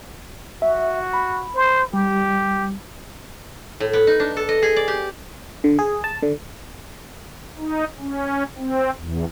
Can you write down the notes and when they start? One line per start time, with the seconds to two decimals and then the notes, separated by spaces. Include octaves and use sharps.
0.62 F#4 E5
1.13 B5
1.55 C5
1.93 G3 G4
3.80 A2
3.93 B3
4.07 D#4
4.20 D4
4.37 A4
4.49 D#5
4.62 G#4
4.76 D5
4.88 G4
5.64 D3
5.79 G#4
6.04 A5
6.23 D3
7.58 D#4
7.99 C#4
8.58 C4
8.98 E2